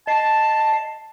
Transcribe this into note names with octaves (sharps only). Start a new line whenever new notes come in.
D#5 A5 C7